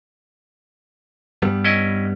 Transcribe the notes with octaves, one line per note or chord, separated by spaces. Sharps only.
G2 G3 B3
C#4 E4 D#5